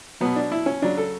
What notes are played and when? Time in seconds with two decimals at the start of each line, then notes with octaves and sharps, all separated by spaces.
0.21 B2 F#3 B3
0.36 D4
0.52 E4
0.66 C#4
0.82 C#3 F#3 D4
0.97 A4